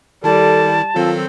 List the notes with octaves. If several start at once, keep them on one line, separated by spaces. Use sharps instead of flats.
D#3 G3 E4 A4 A5
D#3 F#3 C4 F4 A4